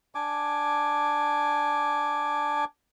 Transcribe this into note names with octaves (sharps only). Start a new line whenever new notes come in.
D4 G#5 D6